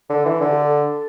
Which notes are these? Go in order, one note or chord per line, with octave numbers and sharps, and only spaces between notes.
D3 A4
E3
D3
G4
A4